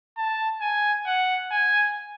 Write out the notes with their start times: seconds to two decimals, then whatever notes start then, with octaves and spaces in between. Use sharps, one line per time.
0.17 A5
0.61 G#5
1.06 F#5
1.51 G#5